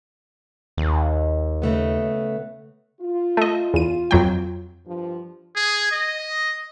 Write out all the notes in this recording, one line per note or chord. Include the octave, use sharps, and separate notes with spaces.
D#2
C#3 A3 B3
F4
A3 D#5
E2 D#7
F2 F#3 G5
G2 F3
G#4
D#5